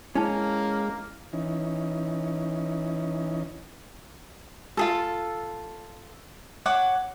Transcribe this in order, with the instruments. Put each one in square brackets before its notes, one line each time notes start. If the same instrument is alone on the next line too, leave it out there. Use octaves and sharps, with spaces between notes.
[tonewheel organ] G#3 [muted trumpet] A#3 [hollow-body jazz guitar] C#4 [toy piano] E4 A5
[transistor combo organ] E3 C#4 D#4
[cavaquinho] F4 G#4 A4
C#5 F#5 D6